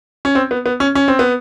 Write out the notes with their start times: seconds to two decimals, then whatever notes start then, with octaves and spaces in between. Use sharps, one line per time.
0.25 C#4
0.35 C4
0.51 B3
0.66 B3
0.80 C#4
0.95 C#4
1.08 C4
1.19 B3